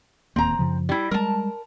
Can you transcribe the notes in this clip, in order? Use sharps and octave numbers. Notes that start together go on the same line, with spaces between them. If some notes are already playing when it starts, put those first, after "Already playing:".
D1 D#2 A#3 C4 A#5
F#2 C#3 F3
G3 E4
G3 G#3 A#4 A5